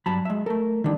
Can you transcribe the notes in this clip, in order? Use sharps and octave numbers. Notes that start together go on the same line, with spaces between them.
G2 F#3 A5 B5
G#3 E5
A3 A4 A#4
D#3 E3 G3 D4